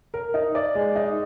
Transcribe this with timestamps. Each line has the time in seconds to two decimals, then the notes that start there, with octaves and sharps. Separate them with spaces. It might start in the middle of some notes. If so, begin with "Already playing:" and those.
0.14 A#4
0.34 D#4
0.55 D5
0.75 G#3
0.95 D#4